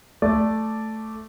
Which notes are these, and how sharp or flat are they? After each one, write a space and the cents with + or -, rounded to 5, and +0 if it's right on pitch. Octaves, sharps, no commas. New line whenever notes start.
A3 +0 D5 +0